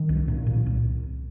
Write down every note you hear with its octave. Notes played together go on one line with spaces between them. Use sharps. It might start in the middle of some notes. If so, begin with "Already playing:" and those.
Already playing: D#3
C2
A#2
A#2
C2